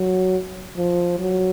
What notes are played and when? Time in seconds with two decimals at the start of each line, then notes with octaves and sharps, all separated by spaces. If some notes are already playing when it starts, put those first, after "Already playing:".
Already playing: F#3
0.77 F3
1.19 F#3